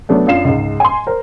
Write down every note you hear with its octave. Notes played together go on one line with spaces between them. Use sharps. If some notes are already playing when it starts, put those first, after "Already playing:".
F#3 A3 B3 D4
F#2 D4 F4 F5 C7 E7
C#2 G#2
G#5 C6
A#4 C5